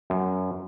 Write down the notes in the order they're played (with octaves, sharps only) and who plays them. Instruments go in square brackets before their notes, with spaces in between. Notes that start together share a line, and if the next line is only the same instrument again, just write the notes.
[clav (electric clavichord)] F#2